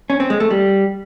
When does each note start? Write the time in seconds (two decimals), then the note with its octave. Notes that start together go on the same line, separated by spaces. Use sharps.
0.10 C#4
0.20 C4
0.30 G#3
0.40 A3
0.51 G3